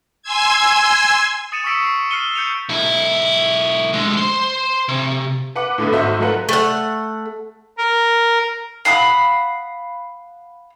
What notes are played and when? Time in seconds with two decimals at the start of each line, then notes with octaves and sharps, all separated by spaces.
0.22 G#5 C6 E6 G#6
1.52 D#6 A6 C#7 D#7 E7
1.64 C#6 D#6 E6 B6 C#7 D7
1.82 C#6 C7
2.11 F6 C7 C#7 D#7 G7
2.35 G6 C#7 D#7 F7
2.69 B1 E4
3.93 D3 G#3
4.17 C5 C6
4.88 C3
5.56 B4 F#5 D6
5.78 A2 D3 A3 B3
5.92 G#1 D#4 F#4 C5 E5
6.20 F#3 A3 F4 A#4 B4 F#5
6.49 A3 F#5
7.78 A#4
8.85 F5 F#5 B5 D#6